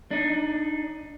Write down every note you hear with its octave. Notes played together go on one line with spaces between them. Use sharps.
D4 D#4